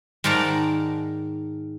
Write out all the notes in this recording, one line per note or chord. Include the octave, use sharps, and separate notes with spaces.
G#2 D#3 A#4 D5 A5 A#5